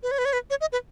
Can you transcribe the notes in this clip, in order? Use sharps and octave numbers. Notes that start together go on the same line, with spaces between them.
B4
C#5
B4
C#5
B4
C#5
D#5
B4